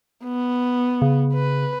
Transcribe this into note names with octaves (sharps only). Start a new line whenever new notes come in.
B3
C#3
B4